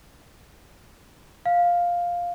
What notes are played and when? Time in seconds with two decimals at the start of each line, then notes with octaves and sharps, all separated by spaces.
1.46 F5